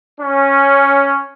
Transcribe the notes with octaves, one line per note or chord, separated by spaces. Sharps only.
C#4